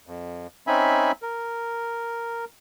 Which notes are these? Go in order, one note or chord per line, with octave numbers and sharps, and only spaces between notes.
F2
C4 C#4 D#4 E5 G#5 B5
A#4